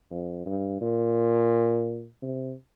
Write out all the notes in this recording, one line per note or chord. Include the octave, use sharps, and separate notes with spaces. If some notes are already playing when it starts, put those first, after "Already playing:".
F2
G2
A#2
C3